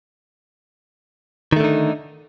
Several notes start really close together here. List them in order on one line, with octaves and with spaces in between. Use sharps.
D#3 A3 D3 D#4